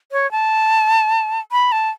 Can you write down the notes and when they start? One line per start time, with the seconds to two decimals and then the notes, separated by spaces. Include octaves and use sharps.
0.12 C#5
0.32 A5
1.52 B5
1.72 A5